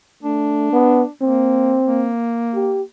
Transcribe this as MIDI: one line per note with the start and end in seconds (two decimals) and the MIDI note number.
0.23 0.69 57
0.23 1.09 62
0.73 1.02 59
1.22 1.79 58
1.22 2.10 60
1.87 2.85 58
2.54 2.82 67